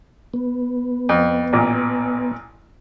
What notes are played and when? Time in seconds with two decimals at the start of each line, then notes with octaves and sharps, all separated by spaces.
0.34 B3
1.09 F2
1.53 A1 A#2